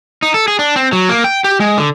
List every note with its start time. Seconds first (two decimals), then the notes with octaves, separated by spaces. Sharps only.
0.23 D#4
0.34 A4
0.48 G#4
0.59 D4
0.76 C4
0.92 F#3
1.09 A#3
1.24 G5
1.44 G4
1.60 G#3
1.77 D3